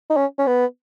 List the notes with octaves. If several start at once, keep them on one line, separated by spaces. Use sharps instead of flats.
D#4
C#4
C#4
B3